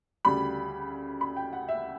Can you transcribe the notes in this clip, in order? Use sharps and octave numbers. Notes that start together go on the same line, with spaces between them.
D2 C#3 G3 B5
B5
G5
F#5
E5